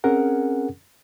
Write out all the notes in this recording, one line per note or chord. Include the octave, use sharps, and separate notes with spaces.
C4 C#4 G#4 A#4 F#5